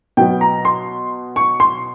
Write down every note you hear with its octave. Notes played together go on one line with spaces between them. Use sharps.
B2 F#3 B3 G5
A#5
C6
C#6
C6